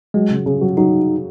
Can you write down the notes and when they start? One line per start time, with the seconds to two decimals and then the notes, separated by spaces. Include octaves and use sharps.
0.14 F#3 G#3
0.30 C#3
0.46 C#3
0.61 F#3
0.77 F#3 D#4